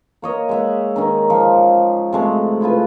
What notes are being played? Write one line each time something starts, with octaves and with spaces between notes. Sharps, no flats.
A#3 C#5 D#5
G#3 E5 F#5
D#3 C#4 D#4
F3
C3 G#3 A3
C#3 E4 F4 B4